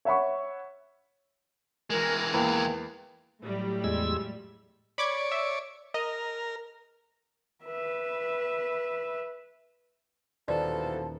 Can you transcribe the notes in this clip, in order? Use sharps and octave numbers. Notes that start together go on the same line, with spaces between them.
C#5 E5 F#5 B5 C#6
E3 G#3 A#4
E2 A#3 G5
A2 F#3 G3
E2 G#3 E6
C#5 D5 B5 D6 G#6
E5
A#4 D#5
B4 E5
D#1 D#2 B2 E3 F3 A4 D5